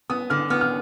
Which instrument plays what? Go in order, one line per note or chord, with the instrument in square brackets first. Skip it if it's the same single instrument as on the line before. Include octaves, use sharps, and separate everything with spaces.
[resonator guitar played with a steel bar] B3 [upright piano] D#6
[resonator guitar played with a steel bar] D3 [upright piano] F6
[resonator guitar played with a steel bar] B3 [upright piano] F6
[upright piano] F6